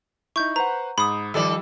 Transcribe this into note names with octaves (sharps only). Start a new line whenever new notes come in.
D#4 E4 C#6 G6
B4 C5 F#5 A#5
G#2 B5 D#6
D#3 F3 G3 A4 D5 E6